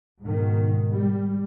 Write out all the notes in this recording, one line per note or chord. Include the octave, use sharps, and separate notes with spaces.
G#2 B2 D#3
G3